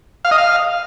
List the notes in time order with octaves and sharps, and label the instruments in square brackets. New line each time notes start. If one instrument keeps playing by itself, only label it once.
[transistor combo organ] F5
D#5
F5